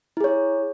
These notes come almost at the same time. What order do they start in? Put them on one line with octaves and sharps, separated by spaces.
E4 G#4 C#5